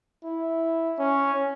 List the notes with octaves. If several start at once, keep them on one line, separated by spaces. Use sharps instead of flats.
E4
C#4